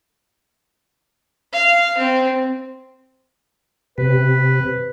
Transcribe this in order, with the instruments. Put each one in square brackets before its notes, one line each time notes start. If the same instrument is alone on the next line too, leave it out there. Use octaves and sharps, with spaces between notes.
[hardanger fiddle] F5
C4
[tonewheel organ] C3 [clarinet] B4